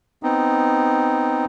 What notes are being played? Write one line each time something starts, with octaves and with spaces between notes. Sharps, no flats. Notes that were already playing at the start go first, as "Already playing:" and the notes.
B3 C4 D#4